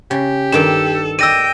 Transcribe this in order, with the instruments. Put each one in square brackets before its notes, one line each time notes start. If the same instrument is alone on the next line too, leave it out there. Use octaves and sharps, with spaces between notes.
[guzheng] C#3 [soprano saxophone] G4
[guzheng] G2 D#3 G5 [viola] A4 [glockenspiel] E7
[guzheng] D5 D#5 [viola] G5 [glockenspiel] E6 A#6 D#7